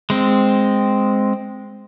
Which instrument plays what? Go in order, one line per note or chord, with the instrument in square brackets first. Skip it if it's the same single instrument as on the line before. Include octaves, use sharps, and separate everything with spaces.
[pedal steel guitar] G#3 C4